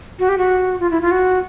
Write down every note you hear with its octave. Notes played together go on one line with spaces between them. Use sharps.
F#4
G4
F#4
F4
E4
F4
F#4